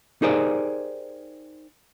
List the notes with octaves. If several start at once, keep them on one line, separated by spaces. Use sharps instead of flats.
D#4 G4 G#4 A#4 C5 D5